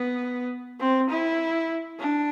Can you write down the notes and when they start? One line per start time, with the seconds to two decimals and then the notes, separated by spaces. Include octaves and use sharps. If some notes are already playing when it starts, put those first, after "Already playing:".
Already playing: B3
0.80 C4
1.10 E4
2.00 D4